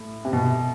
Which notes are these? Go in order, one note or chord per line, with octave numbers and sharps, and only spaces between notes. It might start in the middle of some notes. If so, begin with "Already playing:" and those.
Already playing: A2
C3
B2